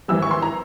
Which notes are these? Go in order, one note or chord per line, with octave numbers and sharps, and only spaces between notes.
G#1 G2 E3 G3 E6
C#6
C6
A#5